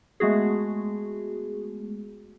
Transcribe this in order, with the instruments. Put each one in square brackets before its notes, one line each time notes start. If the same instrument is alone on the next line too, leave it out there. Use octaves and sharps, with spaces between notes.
[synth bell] G#3 A3 B3 F#4 G#4